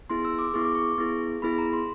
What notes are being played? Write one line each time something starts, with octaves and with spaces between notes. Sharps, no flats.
B3 E4 G#4 C6
E6
D6
B3 E4 G#4 C#6
D6
C#6
B3 E4 G#4
B3 E4 G#4 B5
A#5
C6